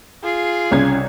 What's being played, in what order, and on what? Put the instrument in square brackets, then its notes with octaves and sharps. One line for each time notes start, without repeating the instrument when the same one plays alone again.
[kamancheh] F4 G#4
[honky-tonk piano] C2 C#4 G#6 [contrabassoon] C#3